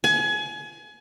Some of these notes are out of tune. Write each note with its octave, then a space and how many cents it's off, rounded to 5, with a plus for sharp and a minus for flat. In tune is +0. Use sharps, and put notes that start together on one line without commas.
G#5 +30